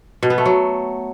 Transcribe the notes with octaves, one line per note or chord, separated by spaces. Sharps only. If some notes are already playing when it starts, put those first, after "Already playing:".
B2
B3
A3
F#3